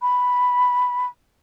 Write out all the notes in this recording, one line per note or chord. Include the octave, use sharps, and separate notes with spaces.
B5